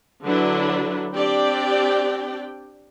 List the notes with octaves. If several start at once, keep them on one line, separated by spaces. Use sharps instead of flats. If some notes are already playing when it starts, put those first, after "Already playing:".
D3 F#3 D4 E4 B4
C4 D4 G4 D5 G5